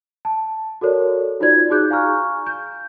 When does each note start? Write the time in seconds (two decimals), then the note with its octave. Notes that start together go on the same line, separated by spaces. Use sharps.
0.25 A5
0.81 F#4 A4 A#4 C#5 D5
1.40 D#4 F4 F#4 C5 D5 G#6
1.70 D#4 F#4 G#4 D6 F#6 G6
1.90 F5 G#5 A#5 C#6 F6
2.47 G6